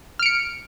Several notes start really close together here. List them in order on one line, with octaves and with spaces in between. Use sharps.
F6 D7 C#7